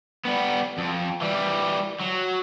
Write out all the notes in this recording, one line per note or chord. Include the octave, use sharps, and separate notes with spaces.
G3 B3
F2
E3 G3
F#3